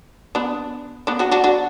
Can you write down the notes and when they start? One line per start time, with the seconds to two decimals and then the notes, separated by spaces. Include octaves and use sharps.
0.35 B3 D4
1.07 B3 D4
1.19 D4 F#4
1.31 D4 F#4
1.44 D4 F#4